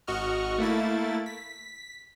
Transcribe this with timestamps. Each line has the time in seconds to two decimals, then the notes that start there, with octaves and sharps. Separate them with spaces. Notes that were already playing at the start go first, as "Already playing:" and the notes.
0.07 G#1 F#4 D#5 C#6 F6
0.58 A3 A#3 E4 A6
1.26 B6